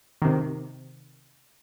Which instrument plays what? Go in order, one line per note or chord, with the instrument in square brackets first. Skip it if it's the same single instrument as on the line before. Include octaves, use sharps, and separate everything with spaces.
[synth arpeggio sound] C3 D#3